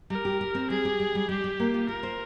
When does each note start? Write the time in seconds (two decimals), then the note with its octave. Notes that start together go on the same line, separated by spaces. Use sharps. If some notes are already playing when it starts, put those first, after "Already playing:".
0.10 G3 A#4
0.25 G4
0.41 G4
0.55 C4
0.70 G3 G#4
0.85 G4
1.00 G3
1.15 G3
1.29 G3 G4
1.44 G3
1.60 A#3
1.74 F4
1.89 F4 A#4
2.03 C5